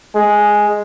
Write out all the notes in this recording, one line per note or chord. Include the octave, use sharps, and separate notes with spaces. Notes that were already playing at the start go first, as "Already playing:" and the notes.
G#3